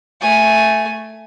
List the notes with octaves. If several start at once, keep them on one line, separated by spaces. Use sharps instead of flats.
A3 G#5